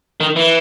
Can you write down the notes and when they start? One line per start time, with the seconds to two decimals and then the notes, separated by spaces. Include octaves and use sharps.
0.20 D#3
0.36 E3